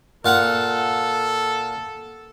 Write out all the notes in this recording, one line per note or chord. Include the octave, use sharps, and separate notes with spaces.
A#2 A4 F5 F#5